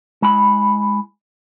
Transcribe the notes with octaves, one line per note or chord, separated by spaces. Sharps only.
G#3 E4 B5